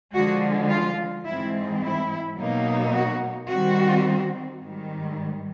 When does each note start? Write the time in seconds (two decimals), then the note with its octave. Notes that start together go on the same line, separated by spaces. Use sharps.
0.14 D3 F3 G#3 F#4
0.70 F4
1.26 G#2 E3 G#3 C4 E4
1.82 E4
2.38 B2 F#3 A#3 D#4
2.94 F#4
3.50 D#3 G3 C4 F#4
4.62 G#2 D#3 G3